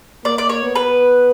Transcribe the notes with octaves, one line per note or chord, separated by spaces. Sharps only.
A#3 D5
D5
C#5
B3
B4